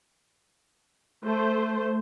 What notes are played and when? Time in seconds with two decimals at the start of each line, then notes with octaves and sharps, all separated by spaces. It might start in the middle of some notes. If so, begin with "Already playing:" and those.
1.24 A3 C5